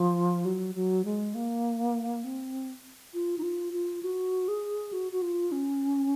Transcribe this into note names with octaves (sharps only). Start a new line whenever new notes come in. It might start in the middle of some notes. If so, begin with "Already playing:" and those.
Already playing: F3
F#3
F#3
G#3
A#3
C4
F4
D#4
F4
F4
F#4
G#4
F#4
F#4
F4
C#4